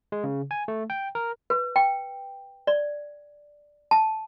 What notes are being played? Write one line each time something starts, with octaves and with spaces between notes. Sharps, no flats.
G#3
C#3
G#5
A3
G5
A#4
B4
G5
D5
A5